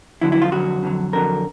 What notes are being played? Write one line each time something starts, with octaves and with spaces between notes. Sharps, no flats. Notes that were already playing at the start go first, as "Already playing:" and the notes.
F2 D3 F#3 E4
E4
F4
F2 D3 F#3 F#4
F2 D3 F#3
F2 D3 F#3 A#4